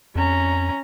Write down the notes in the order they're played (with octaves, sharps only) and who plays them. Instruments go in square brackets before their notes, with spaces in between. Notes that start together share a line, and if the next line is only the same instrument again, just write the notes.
[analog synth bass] F2 [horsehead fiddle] C#4 A#5